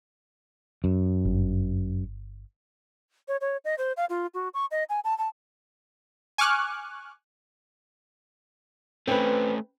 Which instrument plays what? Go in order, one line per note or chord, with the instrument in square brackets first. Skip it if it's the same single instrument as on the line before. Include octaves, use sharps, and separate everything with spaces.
[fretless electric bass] F#2
[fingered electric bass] G1
[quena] C#5
C#5
D#5
C5
F5
F4
F#4
C#6
D#5
G#5
A5
A5
[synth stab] G#5 C#6 D6 F6 F#6
[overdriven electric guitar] A3 C#4 [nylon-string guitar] C4 B4